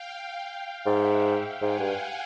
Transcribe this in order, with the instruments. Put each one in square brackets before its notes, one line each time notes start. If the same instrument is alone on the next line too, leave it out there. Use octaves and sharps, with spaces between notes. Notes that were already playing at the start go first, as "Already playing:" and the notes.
Already playing: [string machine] F5 G5
[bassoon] G#2 [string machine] E5 F#5
[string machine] F5 G5
[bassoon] G#2 [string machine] F#5 G#5
[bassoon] G2